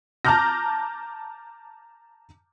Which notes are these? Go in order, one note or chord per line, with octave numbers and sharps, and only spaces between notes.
A5 A#5 D6 F6 G6 A#6